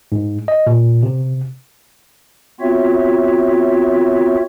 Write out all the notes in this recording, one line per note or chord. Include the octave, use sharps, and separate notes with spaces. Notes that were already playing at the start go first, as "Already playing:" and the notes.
G#2
D#5
A#2
C3
B3 C4 F4 F#4 C#5 E5